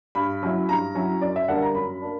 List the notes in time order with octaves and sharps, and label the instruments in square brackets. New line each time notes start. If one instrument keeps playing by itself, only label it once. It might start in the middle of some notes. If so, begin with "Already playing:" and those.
[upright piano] G2 B5
F#3 C#4 E4
G2 A#5
F#3 C#4 E4
F#2 D5
E5
D3 G3 A#3 D4 F#5
A#5
F#2 B5
A#3 D4